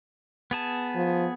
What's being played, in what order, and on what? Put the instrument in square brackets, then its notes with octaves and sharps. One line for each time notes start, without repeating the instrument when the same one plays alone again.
[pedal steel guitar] B3 G#4 A5
[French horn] F3